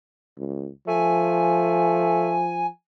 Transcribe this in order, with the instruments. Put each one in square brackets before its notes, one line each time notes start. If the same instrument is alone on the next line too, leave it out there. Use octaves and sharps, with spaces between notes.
[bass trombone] C#2
[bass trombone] F3 [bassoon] A3 [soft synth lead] G#5